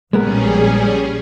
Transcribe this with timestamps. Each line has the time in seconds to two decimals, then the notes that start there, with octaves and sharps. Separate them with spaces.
0.13 A#1 G3 G#3 B3 C#4 G#4 A#4